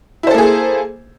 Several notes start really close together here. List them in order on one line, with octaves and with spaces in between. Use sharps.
E4 C5 A4 A#3 G#4